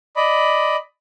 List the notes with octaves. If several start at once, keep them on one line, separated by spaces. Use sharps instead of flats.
D5 D#5 B5